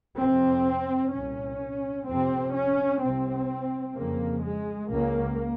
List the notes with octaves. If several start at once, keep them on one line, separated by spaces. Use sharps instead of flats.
F2 C3 C4
C2 A#2 C#4
F2 C3 C4
C#4
C2 C3 C4
F2 C#3 A#3
G#3
C#2 C#3 A#3